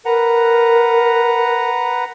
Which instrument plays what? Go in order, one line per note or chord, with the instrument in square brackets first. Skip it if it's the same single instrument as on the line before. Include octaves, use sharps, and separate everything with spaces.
[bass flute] A#4 [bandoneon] B4 F#5 A#5